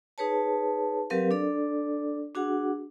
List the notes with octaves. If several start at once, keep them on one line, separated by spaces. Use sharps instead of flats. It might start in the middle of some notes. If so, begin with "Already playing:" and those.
D#4 G#4 B4 C#5 A5
F#3 C4 G4 A#4 B4 F5
D4 A4 D5
D4 F#4 G#4 F#5